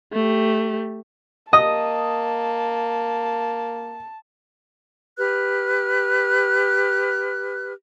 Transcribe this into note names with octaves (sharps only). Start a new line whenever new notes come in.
A3 G4
A#3 D#5 A5 D#6
G4 B4 F6 F#6